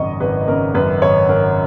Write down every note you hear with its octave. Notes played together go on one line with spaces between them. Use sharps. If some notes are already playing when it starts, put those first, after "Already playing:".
Already playing: G#1 F#2 C#3 D#5 C#6
G#1 B4
C#3 A#4
F#2 B4
G#1 C#5
G#1 A#4